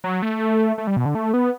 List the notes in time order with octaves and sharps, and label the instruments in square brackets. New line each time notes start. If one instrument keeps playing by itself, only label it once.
[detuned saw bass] F#3
A3
A3
G3
B2
D3
A3
B3